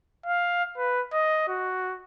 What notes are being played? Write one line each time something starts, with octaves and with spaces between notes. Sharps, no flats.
F5
B4
D#5
F#4